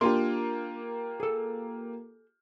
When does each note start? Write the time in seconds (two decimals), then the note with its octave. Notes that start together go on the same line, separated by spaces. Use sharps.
0.01 A#3 D4 F4 G4 C6
1.20 G#4 A4